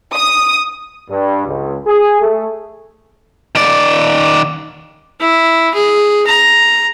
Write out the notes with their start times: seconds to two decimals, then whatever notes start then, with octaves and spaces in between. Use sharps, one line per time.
0.15 D#6
1.10 G2
1.47 C#2
1.87 G#4
2.21 A3
3.55 D#3 D5
5.20 E4
5.74 G#4
6.27 A#5